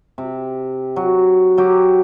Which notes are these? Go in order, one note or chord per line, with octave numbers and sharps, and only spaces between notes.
C3
F#3
F#3 G4